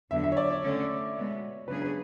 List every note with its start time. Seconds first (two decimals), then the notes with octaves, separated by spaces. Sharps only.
0.11 E2 D3 F#3 B3 E5
0.24 E5
0.32 C#5
0.37 D5
0.51 C#5
0.63 D3 A3 C#4
1.15 B2 G#3 B3
1.68 C#3 F#3 B3 D4 G#4 B4
1.82 B4